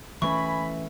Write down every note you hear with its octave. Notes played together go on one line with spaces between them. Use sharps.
E3 A3 C#4 B4 E5 G#5 B5 C#6